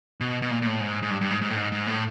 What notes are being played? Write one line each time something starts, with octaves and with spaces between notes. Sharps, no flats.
B2
B2
A#2
A#2
A2
G#2
G#2
G2
G2
G#2
G#2
A2
G#2
G#2
A2